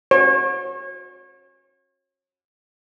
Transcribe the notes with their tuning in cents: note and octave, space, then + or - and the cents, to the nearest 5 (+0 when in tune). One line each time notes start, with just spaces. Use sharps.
C#5 -35